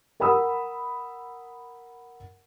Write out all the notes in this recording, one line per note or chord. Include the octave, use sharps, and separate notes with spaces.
A#4 F#5 B5 D#6 E6